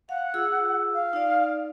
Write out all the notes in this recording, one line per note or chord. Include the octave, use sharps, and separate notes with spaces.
F5 F#5
F4 G#4 E6
F5
D#4 D5